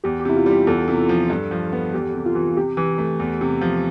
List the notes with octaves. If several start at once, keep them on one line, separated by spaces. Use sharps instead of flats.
E2 G4
G4
C3 E4
F4
G3
G4
E2 A4
C3
F3
G2
F3
B3
E2 G4
C3
F4
E3
C3 G4
E3
A3
E2
C3
F3